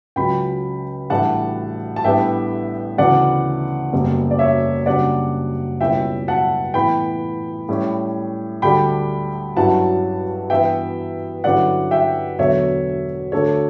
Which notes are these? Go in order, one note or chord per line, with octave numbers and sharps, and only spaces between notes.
C#2 C#3 F#3 G5 B5
A1 A2 E3 G3 D4 F#5 A5
A5
A1 A2 G3 B3 D4 E5 G5
D2 C#3 E3 B3 D5 F#5
F#1 E2 C#3 G3
D5
C#5 E5
F#1 F#2 C#3 G3 D4 D5 F#5
C#2 B2 G3 C#4 E4 E5 G5
F#5 A5
A2 E3 B3 G5 B5
A2 G3 C#4
D2 D3 G3 D4 G5 B5
G2 F#3 C#4 E4 F#5 A5
G2 E3 B3 E5 G5
G2 D3 F#3 C#4 E4 D5 F#5
E5 G5
E1 E2 D3 F#3 C#5 E5
D2 D3 A3 D4 A4 C#5